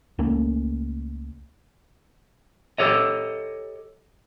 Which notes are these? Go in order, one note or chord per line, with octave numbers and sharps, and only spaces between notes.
C#2 A3 A#3 C#4
G4 A4 C#5 D#5